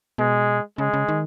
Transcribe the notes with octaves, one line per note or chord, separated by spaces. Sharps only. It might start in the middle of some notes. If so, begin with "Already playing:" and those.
B2 G#3
C#3 G#3
C#3
D#3